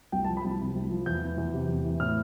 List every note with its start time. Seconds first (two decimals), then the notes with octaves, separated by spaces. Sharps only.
0.12 C2 G5
0.24 A5
0.29 F3
0.37 B5
0.45 C2
0.60 C3
0.75 C2
0.90 F3
1.06 E2 G6
1.22 E3
1.38 E2
1.53 C3
1.69 E2
1.85 E3
2.00 A2 F6